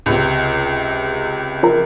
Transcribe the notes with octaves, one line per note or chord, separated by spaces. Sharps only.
C#2 C3
F3 A#4